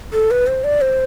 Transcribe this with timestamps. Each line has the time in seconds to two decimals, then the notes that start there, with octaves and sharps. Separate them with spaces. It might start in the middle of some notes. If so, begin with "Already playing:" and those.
0.13 A4
0.31 B4
0.47 C5
0.64 D5
0.81 C5